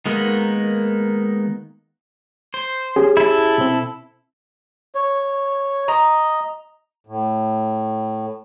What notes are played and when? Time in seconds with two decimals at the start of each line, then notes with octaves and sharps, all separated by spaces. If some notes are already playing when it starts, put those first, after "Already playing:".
0.06 D#3 G#3 A#3 B3 D#4
2.54 C5
2.96 C#4 G4 G#4
3.17 E4 A4
3.58 B2 C4
4.95 C#5
5.88 D#5 A#5
7.07 A2